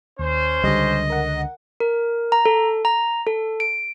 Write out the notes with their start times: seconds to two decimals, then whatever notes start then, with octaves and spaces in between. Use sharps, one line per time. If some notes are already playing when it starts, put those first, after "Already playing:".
0.19 D#2 C#4 C5
0.64 C#2 D3 G3 D#5
1.10 A#4 F#5
1.80 A#4
2.32 A#5
2.45 A4
2.85 A#5
3.27 A4
3.60 D7